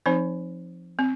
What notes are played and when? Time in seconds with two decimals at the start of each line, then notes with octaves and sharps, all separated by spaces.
0.06 F3 C4 D#4 C5
0.99 C4